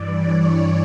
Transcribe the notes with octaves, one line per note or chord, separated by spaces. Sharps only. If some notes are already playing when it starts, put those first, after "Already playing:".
Already playing: G2 E3 D5
C#5